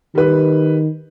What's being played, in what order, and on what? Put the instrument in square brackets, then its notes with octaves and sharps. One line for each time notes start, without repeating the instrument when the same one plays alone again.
[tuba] D#3 [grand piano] G3 B4